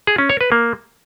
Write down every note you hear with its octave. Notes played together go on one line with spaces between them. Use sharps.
G#4
C#4
C#5
B4
A#3